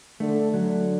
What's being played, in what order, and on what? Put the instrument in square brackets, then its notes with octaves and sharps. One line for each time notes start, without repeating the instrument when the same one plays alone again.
[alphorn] D3 [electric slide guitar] A3
[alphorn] D3 [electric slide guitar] F#3